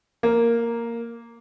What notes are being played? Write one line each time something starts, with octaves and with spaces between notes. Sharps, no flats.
A#3